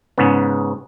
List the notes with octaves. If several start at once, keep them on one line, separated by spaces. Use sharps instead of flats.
G#2 C#3 B3